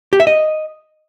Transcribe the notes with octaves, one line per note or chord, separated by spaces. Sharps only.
G4
E5
D#5